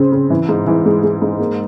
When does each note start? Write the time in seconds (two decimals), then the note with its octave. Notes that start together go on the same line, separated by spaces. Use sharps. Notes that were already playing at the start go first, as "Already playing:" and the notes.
Already playing: C#3 C4
0.12 C#3
0.30 E3
0.49 G#2
0.67 E3
0.86 G#3
1.03 G#3
1.22 G#2
1.39 A#3